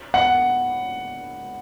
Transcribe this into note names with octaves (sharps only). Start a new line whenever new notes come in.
F#5